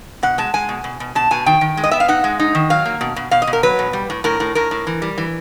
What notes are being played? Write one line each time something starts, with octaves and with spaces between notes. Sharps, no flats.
B2 F#5
G#3 A5
G#3 G#5
B2
B2
B2
B2 A5
B2 G#5
D#3 G5
D#3
G#3
D#5
B3 E5
F5
D#4 F#5
G#3
D#4
D#3
F#3 F5
A#3
B2
B2
B2 F5
D#5
B2
A#4
F#3 B4
B2
G3
A2
A2 A#4
A2
A2 A#4
A2
E3
G3
E3